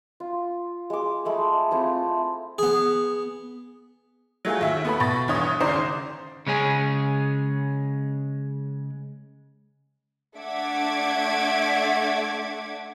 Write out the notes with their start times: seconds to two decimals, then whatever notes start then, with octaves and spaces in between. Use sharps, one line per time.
0.20 F4
0.90 G#3 D6
1.25 G#3 A3 B5
1.71 A3 C4 E4 F4
2.58 B3 G#4
4.45 F#3 A3 F4 G#4
4.61 D#2 E5
4.85 B3 A4 B5
5.00 B2 A6
5.28 E2 G2 C#5 D#6
5.60 G#1 G#2 C#3 C5 D5 A#5
6.47 C#3 G#3 C#4 G#4
10.36 A3 D4 E5 F#5 D6 G#6